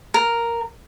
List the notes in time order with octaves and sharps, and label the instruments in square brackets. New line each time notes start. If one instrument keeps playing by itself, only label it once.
[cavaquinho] A#4